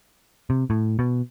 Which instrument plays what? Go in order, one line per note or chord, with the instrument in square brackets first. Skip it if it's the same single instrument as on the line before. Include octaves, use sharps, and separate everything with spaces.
[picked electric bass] C3
A2
B2